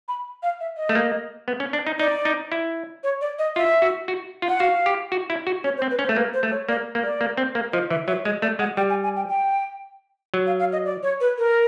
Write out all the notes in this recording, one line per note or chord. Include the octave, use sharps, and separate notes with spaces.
B5
F5
E5
D#5
A3
A#3
B3
C#4
D4
D#4
D#4 D5
D#4
E4
C#5
D5
D#5
F4 E5
F#4
F#4
F4
F#5
F#4 F5
G4
F#4
E4
F#4
C#4 C#5
C5
C4
B4
C#4
C5
A3
A#3 B4
C5
A3
C#5
A#3 D5
A#3
D5
A#3
C4
A#3
F3 D#5
E3 E5
F#3 E5
G#3 D#5
A3 D5
G#3 F#5
G3 G5
G#5
G#5
G5
G5
F#3
F5
F5
D#5
D5
C#5
B4
A#4